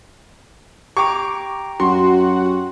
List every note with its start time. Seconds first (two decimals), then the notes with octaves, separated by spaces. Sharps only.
0.97 G4 G5 A#5 C#6 D6
1.80 F#2 F#4 C6